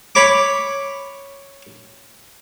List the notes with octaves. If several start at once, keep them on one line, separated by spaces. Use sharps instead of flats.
C#5 B5 D6